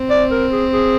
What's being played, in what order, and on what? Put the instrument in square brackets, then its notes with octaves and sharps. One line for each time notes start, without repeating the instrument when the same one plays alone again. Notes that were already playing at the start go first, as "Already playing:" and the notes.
Already playing: [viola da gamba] C4
[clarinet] D5
A#4
G#4
G#4